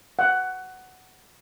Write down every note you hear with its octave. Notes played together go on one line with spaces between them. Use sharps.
F#5